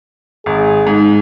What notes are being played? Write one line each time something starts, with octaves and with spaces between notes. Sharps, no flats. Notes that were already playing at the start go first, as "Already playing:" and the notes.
G#1 G#4
G#2